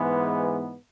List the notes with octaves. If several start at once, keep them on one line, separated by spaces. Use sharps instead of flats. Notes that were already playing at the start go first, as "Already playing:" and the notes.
Already playing: G#2 E3 G#3 B3